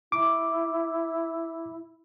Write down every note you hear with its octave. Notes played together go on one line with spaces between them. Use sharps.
E4 D6